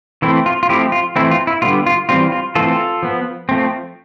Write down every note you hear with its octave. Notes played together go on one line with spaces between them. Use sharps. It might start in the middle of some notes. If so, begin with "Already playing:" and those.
E3 A3 C4 E4
F4
F4
F3 A3 C4 E4 G4
F4
E3 A3 C4 E4
F4
E4
D3 G3 B3 F4
F4
E3 G3 C4 F4
F4
E3 A3 C4 F4 A4
F3 B3
F3 A3 C4